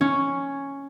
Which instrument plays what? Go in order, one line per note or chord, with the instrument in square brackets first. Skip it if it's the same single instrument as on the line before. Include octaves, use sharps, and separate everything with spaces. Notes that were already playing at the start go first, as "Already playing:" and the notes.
[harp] C#4